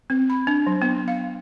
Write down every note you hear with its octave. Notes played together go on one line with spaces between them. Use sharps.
C4
B5
D4
F#3
B3
F5